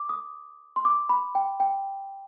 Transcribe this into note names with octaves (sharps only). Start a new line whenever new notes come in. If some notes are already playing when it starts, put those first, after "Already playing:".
Already playing: D6
D#6
C6
D6
B5
G5
G5